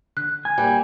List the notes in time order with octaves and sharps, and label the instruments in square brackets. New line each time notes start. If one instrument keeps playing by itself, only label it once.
[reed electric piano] D3 [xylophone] F#6
[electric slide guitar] G#5
[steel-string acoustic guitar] G3 [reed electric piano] A#3 D5 G5